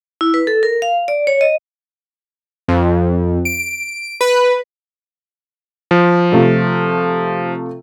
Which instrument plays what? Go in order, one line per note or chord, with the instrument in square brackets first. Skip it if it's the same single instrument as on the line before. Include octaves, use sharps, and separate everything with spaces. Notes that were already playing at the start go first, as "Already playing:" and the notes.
[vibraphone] E4
B4
A4
A#4
F5
D5
C#5
D#5
[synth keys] F2
D7
B4
[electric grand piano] F3
[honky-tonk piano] C3 A3 F4